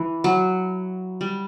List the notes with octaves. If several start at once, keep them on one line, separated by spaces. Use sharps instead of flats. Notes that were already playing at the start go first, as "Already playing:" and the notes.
Already playing: E3
F#3
G3